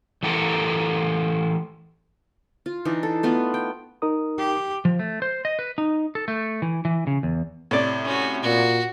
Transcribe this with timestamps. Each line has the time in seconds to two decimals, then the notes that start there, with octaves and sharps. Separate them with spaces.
0.23 E3 A3 G4 A4 A#4
2.66 F4
2.85 E3 D4 D#4
3.03 A4
3.23 A3 B3 F4 B4
3.54 G5
4.02 D#4 A#4 D#6
4.38 G4
4.85 F3
4.99 A3
5.22 C5
5.45 D#5
5.59 B4
5.78 D#4
6.15 A4
6.28 A3
6.62 E3
6.85 E3
7.07 C#3
7.23 E2
7.71 A2 C3 C#5 D5
8.04 C#4 F#4
8.43 A#2 F#4